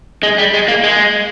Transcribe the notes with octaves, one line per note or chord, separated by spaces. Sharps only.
G#3
G3
G#3
A#3
G#3